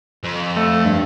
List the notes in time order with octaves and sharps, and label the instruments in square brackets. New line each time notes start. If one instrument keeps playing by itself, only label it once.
[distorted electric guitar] F2
[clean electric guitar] A3
G2